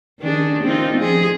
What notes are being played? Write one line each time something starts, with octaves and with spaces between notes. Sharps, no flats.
D#3 D4 G#4
C4 D#4 F4
F3 G#4